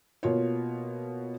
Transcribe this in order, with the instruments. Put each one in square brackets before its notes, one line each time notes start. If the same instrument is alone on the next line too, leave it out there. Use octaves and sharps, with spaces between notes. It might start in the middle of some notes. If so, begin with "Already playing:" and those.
[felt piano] B2 A#3 F4 C#5